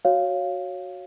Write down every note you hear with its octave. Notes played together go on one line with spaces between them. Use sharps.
F#4 C#5 F5